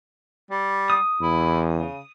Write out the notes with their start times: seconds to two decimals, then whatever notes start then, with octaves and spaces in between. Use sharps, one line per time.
0.51 G3
0.90 D#6
1.21 E2 E4
1.74 C#3